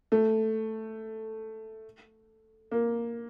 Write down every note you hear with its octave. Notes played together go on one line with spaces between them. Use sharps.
A3
A#3